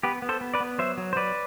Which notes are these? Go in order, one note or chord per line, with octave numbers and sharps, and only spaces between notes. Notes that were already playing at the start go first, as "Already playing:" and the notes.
B3 G4 B4
B3
A4 C5
B3
B4 D5
B3
F#3 C5 E5
F#3
C5
F#3 B4 D5